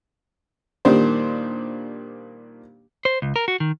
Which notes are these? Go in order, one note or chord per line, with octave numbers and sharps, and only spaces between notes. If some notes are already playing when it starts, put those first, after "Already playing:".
A#2 D#3 G3 D4 C5
C5
C#2
A#4
F#4
D#3